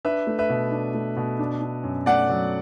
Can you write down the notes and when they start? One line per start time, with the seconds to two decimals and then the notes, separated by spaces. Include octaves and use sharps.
0.05 D4 B4 E5
0.27 A3
0.39 B4 E5
0.49 B2
0.72 D4
0.94 A3
1.17 B2
1.39 D4
1.62 D4
1.84 F#2
2.06 A3 D5 F#5
2.30 F#3